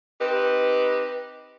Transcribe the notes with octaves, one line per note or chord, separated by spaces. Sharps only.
C4 D#4 G4 B4